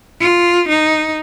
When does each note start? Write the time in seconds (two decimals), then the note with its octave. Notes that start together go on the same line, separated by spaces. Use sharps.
0.20 F4
0.69 D#4